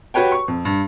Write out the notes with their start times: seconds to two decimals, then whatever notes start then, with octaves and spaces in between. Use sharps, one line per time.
0.14 F#4 G4 B4 C#5 G5
0.32 C#6
0.48 F2
0.65 G2